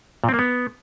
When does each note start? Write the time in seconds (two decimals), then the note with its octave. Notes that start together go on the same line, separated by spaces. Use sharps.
0.24 A#2
0.29 C4
0.34 A#3
0.39 B3